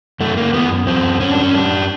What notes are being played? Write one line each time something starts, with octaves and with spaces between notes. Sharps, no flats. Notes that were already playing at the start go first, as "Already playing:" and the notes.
F#2 A3
A#3
F#2 B3
F#2 C4
F#2 C#4
D4
C#4
F#2 D4